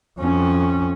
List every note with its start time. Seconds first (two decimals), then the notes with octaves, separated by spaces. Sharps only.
0.20 F2 C#4